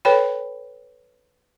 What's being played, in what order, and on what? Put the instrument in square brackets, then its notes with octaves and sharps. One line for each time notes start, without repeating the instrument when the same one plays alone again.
[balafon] A4 B4 C#5 G5 B5